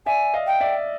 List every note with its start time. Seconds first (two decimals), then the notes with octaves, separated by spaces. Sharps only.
0.06 D5 E5 G#5
0.34 D#5 F5
0.47 G5
0.60 D5 E5